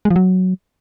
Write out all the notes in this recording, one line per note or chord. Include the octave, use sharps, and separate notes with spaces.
G#3
F3
F#3